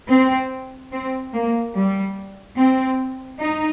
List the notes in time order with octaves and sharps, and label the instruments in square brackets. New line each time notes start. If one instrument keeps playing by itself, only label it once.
[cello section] C4
C4
A#3
G3
C4
D#4